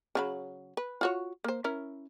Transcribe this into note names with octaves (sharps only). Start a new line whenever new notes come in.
C#3 F#3 B5
B4
F4 F#4 C#5
A#3 C5
C#4 E4 A#4